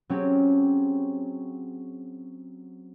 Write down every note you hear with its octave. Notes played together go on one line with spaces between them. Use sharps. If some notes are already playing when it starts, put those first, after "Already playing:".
F#3 C4 C#4 G4 G#4